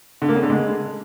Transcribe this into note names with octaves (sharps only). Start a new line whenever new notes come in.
D3
A#3
C#3
D3
G#3